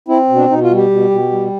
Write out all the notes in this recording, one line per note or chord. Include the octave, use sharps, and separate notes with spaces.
C4 E4
B2
D4
B2 D#4
F4
G3
G4
B2
B2
G3